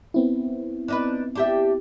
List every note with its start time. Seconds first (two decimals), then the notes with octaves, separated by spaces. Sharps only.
0.14 B3 C4 E4
0.88 D4 D#4 B4
1.35 D4 G4 E5